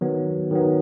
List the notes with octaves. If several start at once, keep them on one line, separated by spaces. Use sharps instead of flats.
D#3 F#3 B3
D#3 F#3 B3